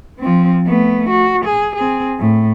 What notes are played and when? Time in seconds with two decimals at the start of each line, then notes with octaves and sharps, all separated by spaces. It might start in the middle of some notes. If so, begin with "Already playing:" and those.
0.19 F3 C4
0.66 A3 B3
1.10 F#4
1.45 G#4
1.76 C4 G#4
2.19 A2